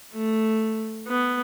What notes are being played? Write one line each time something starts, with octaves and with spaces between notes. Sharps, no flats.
A3
B3